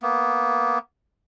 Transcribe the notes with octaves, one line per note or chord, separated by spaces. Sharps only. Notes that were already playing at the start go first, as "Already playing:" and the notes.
A#3 B3